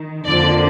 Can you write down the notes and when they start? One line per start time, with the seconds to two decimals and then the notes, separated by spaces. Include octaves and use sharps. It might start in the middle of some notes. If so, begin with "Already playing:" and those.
Already playing: D#3
0.25 F2 D3 F3 A#3 D5